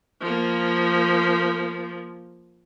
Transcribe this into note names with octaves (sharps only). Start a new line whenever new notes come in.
F3 A#3